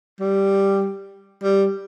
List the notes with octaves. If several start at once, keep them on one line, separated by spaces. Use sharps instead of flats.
G3
G3